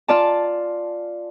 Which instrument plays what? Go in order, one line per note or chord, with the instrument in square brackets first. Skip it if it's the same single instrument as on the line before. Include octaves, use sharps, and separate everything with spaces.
[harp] F4 D5 A5